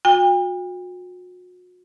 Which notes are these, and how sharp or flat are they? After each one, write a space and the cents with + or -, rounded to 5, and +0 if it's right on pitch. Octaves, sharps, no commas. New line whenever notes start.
F#4 -40 G5 +40